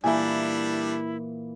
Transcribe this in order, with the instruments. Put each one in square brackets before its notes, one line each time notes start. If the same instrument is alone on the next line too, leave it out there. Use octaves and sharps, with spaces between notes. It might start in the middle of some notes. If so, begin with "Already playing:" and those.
[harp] A#2 E3 [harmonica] G3 D4 [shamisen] A3 G#5 [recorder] E4